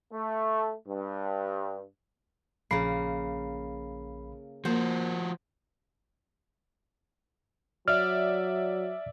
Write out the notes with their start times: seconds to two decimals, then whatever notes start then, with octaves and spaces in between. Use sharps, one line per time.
0.12 A3
0.87 G2
2.71 A#1 C#3 A#3 B5 C7
4.65 F3 A#3 F#4 C5
7.88 F#3 D5 E5 F6